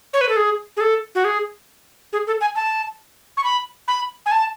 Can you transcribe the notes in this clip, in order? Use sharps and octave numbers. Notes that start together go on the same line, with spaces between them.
C#5
B4
A4
G#4
G#4
A4
F#4
G#4
G#4
A4
G#5
A5
C#6
B5
B5
G#5
A5